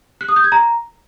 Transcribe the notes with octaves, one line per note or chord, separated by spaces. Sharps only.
F#6
D#6
G6
G#6
A#5